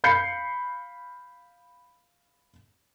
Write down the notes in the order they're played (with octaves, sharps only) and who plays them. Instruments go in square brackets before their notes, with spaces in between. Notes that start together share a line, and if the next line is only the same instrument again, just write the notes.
[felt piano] F5 B5 G6 C7 C#7